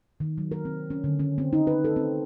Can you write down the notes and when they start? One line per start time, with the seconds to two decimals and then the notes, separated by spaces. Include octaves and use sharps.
0.20 D#3
0.38 F#3
0.52 A#4
0.65 C4
0.90 C#4
1.04 D3
1.19 C#4
1.38 C4
1.53 D#4
1.67 B4
1.84 A4
1.96 C4